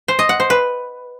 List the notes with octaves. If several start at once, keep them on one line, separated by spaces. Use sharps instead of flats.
C5
D#5
F#5
C5
B4